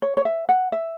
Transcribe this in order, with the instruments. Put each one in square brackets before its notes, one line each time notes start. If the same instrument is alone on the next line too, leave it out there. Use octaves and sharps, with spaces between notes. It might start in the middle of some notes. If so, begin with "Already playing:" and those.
[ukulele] C#5
C#5
E5
F#5
E5